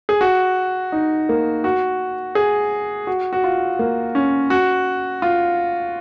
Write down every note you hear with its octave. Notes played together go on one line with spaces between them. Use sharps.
G#4
F#4
D#4
A#3
F#4
G#4
F#4
F#4
F4
A#3
C#4
F#4
F4